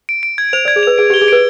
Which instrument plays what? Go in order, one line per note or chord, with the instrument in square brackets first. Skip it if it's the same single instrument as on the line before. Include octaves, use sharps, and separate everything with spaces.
[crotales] D7
D7
G#6
[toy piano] C5 [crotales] F7
[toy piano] D5 [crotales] G#6
[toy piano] G#4
[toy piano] B4 [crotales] F7
[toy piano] G#4 [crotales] D7
[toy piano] G4
[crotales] G7
[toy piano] G#4
[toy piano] B4 [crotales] D7